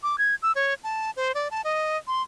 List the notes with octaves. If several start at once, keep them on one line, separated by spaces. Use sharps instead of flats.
D6
G#6
E6
C#5
A5
C5
D5
A5
D#5
C6